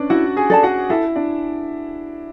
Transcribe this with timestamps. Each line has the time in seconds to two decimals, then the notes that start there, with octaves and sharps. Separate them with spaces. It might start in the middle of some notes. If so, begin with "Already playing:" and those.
Already playing: C#4 D4 B4 D5
0.10 E4 F#4 F#5
0.37 G#4 G#5
0.50 A4 D5 A5
0.63 F#4 F#5
0.90 E4 A4 E5
1.16 D4 D5